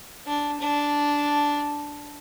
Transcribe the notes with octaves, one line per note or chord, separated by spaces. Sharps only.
D4
D4